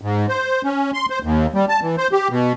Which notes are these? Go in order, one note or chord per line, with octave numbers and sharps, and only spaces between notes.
G#2
C5
C#4
C6
C5
D#2
G3
A5
E3
C5
G4
B2